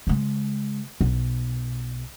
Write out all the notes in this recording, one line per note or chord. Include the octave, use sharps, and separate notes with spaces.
C#3 G#3
B1